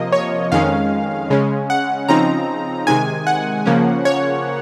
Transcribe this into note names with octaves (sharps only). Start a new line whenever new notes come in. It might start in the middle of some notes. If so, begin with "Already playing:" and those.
Already playing: C3 F3 A#3 D#5
C#5
F2 D#3 G#3 C#4 F5
C#3 G#3 C#4
F#5
C#3 F3 C4 D#4 A#5
C3 D#3 G#3 G#5
F#5
C#3 F3 A#3 C#4
C#5